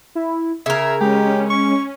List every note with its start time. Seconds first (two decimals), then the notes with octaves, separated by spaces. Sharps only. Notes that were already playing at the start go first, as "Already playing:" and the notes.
0.15 E4
0.66 C#3 A#4 E5 G#6
1.01 G#3 C#4 G4
1.50 C#6